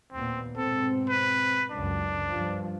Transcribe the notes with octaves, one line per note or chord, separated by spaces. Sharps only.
D#2 A#2 B3 C4
G#2 B2 C4 A4
B4
C#2 F#2 D4
G2 F3